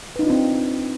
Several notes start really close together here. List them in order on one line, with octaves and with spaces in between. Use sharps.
B4 D#4 D4 F4 C4